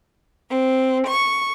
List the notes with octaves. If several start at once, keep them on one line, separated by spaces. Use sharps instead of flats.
C4
C#6